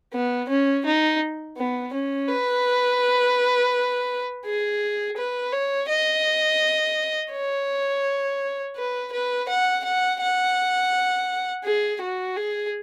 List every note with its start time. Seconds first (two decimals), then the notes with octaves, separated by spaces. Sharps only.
0.13 B3
0.49 C#4
0.86 D#4
1.57 B3
1.93 C#4
2.28 B4
4.45 G#4
5.17 B4
5.53 C#5
5.89 D#5
7.33 C#5
8.76 B4
9.12 B4
9.48 F#5
9.84 F#5
10.21 F#5
11.64 G#4
12.01 F#4
12.36 G#4